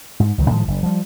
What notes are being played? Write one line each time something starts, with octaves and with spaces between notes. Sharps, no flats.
G#2
C#2 D#3 F3 F#3
A2 D#3 F3 G#3
F#1
F3 G3